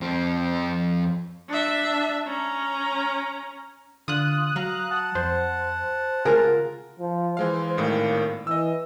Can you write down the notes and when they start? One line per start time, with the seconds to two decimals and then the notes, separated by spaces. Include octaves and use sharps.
0.01 F2 C4
1.49 D4 E5
2.27 C#4 A#5
4.08 D3 F4 D#6 F#6
4.56 F#3 F5 A#5
4.91 F#5 A5
5.15 F2 C5
6.25 C#3 F4 G#4 A#4
6.99 F3
7.37 E3 G#3 C5 F5
7.77 G#1 A2 D#3 A#3
8.47 E3 D#5 E6